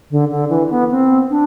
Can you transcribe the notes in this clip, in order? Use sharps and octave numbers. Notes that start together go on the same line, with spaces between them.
D3
D3
E3
B3
C4
D4